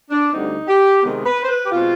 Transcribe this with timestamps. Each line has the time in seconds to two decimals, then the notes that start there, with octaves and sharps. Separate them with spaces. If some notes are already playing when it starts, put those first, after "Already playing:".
0.11 D4
0.33 D2 D3 G3 C4 D#4
0.68 G4
1.03 C3 D#3 G#3 B3
1.25 B4
1.43 C5
1.49 B4
1.66 G4
1.72 B2 G#3 C4 F4